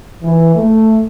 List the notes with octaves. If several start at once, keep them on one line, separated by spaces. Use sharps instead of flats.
E3
A3